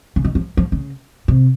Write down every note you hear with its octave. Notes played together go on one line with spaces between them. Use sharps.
C#3
D#3
F3
F3
C#3
C3